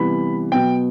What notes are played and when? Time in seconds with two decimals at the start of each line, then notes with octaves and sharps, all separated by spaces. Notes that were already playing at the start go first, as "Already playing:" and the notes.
Already playing: C3 E3 G3 B3 B5
0.52 B2 F#3 B3 G5